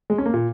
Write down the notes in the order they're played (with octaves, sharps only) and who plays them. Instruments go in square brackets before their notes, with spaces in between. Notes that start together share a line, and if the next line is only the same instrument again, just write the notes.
[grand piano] G#3
C#4
A#3
A#2